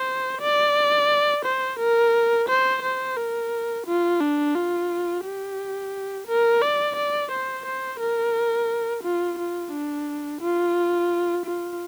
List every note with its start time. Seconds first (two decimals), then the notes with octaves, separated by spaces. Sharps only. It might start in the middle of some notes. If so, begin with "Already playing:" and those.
Already playing: C5
0.41 D5
1.45 C5
1.79 A#4
2.49 C5
2.82 C5
3.17 A#4
3.87 F4
4.21 D4
4.55 F4
5.25 G4
6.27 A#4
6.62 D5
6.96 D5
7.32 C5
7.65 C5
8.00 A#4
9.03 F4
9.39 F4
9.72 D4
10.41 F4
11.46 F4